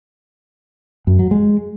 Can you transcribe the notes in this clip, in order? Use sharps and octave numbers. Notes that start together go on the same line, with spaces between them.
F#2
F#3
G#3